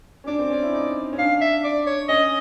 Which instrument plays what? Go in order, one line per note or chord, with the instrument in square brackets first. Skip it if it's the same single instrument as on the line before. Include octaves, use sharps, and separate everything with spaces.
[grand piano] C#4
[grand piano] D4 [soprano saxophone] D5
[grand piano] C4
C#4
E4
D#4
C#4
[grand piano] D4 [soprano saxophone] F5
[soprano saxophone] E5
D5
C#5
[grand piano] C#4 [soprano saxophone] D#5